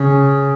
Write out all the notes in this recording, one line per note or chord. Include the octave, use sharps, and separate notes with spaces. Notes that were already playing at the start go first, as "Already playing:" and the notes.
Already playing: C#3